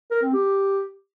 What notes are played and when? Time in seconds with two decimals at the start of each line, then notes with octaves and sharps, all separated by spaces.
0.11 A#4
0.22 C4
0.33 G4